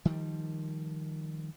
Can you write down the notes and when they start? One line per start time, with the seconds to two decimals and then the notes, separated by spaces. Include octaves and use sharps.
0.05 D#3 F3 G3